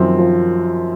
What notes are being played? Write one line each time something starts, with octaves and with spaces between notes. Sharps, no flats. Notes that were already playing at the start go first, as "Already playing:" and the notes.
Already playing: F#2 D#3 F3 C4
F3